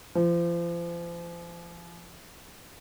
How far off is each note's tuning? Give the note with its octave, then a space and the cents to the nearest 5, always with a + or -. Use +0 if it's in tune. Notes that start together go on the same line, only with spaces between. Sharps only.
F3 -35